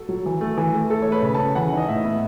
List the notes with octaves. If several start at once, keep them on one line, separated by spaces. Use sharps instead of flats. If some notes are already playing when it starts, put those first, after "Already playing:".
Already playing: F#4 A4
F#3
E3
A3
E3
A3
A3 A4
C#5
A3 B4
C#3
A5
C#3
E3 F#5
D#4
D#5
A2 E5
B3